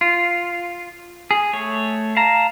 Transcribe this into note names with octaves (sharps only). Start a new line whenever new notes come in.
F4
G#4
A3 C#5
F5 A5 A#5